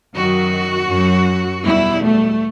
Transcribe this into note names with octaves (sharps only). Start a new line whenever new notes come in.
F#2 D#3 F#3 F#4
F#2 F#3
E2 B2 G3 E4
A3